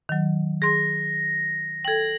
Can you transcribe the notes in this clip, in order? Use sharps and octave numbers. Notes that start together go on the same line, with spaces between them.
D#3 F#3
G#4 C6 A#6
A4 G5 G#6 F#7